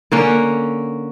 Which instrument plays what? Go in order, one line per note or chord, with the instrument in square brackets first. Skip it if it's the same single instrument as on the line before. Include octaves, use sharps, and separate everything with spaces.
[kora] D3 A#3 C#4